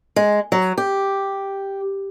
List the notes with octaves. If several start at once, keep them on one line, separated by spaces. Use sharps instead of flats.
G#3
F#3
G4